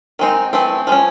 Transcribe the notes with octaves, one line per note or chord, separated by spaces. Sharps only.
D#3 G#3 C4 D#4
E3 A3 C4
F3 G#3 C#4